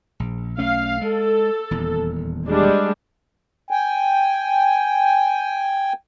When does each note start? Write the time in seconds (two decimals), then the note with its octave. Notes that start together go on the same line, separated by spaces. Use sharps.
0.20 A#1
0.58 B1 A3 C#4 F5
1.01 G#3 A4
1.71 D#1 E2
2.47 G3 G#3 D4
3.71 G5 G#5